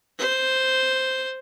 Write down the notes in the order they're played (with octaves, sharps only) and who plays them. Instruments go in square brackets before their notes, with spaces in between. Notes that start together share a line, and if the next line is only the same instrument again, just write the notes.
[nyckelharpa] C5